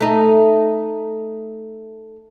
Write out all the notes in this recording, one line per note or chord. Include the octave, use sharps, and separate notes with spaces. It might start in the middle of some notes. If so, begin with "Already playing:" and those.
A3 D#4